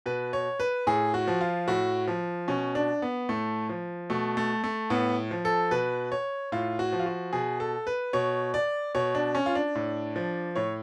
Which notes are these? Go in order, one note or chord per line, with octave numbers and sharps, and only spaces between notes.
B2 B4
C#5
B4
A2 G#4
F#4
F3
F4
A2 F#4
F3
B2 C#4
D4
B3
A2 A3
F3
B2 A3
A3
A3
A2 B3
F3
A4
B2 B4
C#5
A2 F4
F#4
F3
F4
F#4
B2 G#4
A4
B4
B2 C#5
D5
B2 C#5
D4
C#4
F4
D4
A2
F3
A2 C#5